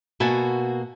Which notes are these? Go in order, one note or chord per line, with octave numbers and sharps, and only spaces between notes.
B2 A#3 F#4 E5 G#5 A5